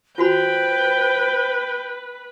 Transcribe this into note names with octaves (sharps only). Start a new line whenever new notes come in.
F4 F#4 B4 C5 G5 B5